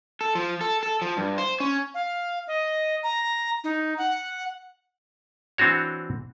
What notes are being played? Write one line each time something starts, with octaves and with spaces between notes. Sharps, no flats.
A4
F3
A4
A4
F3
G2
C5
C#4
F5
D#5
A#5
D#4
F#5
E3 C4 D4 F#4 C#5